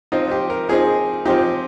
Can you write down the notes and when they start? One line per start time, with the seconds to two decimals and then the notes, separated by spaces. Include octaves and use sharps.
0.12 F3 C4 D#4 F4
0.31 G4
0.50 A#4
0.69 F3 C4 D#4 G#4
1.25 F3 C4 D#4 G4